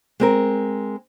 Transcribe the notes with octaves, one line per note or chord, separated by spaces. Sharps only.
G#3 C4 A#4